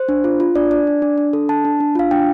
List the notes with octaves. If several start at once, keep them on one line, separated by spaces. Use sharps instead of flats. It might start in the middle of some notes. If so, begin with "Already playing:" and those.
Already playing: C5
D4
F4
F4
D4 D5
D4 D5
D4
D4
D4
A4
D4 A5
D4
D4
F4 F5
D4 G5